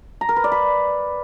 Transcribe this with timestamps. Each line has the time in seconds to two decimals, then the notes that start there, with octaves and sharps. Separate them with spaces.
0.21 A#5
0.29 A#4
0.36 B4
0.44 D5
0.52 B5